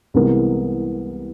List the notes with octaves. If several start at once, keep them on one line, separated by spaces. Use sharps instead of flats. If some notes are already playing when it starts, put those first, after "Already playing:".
C2 C3 E3 G#3 B3 A#4